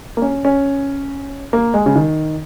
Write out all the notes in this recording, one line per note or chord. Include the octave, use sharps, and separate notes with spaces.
A#3
C#4
C#4
A#3
G#3
C#3
D#3